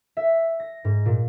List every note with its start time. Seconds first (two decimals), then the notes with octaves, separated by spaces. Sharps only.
0.17 E5
0.60 A#6
0.84 G#2
1.06 A#2